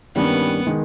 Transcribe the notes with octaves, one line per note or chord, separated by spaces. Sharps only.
G2 D#3 G3 A#3 B3 C#4
D#3 G#3